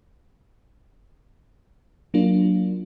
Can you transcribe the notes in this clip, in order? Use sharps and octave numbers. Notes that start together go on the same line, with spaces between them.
F#3 A#3 D4 F4